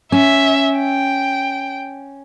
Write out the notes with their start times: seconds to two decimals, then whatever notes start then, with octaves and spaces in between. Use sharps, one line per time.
0.12 C#4 E5
0.78 G5